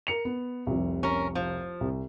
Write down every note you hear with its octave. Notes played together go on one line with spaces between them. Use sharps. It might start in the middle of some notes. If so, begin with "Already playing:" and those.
A#4 C#7 F7
B3
F1 C2
C#4 A#4
F3
C2